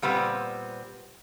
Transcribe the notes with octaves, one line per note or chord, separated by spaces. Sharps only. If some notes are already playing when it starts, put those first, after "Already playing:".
A#2 G3 B3 C4